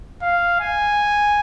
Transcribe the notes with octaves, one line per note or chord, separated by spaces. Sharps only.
F5
G#5